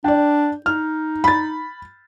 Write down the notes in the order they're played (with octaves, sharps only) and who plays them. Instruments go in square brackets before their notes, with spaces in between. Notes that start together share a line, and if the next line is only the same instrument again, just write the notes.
[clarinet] D4 [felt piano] D5 G5
[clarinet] D#4 [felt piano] F6
[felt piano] B5 A6